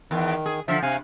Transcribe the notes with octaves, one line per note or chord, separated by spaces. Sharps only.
E2 D#3
G#4
D3 F3 E5
C3 F5 G#5